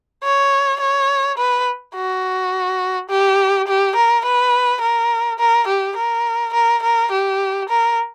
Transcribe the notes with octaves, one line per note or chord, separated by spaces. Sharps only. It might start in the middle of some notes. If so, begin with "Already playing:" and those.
C#5
C#5
B4
F#4
G4
G4
A#4
B4
A#4
A#4
G4
A#4
A#4
A#4
G4
A#4